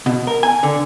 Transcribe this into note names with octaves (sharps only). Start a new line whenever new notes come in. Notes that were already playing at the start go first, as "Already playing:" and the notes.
B2
A#4
G#5
D3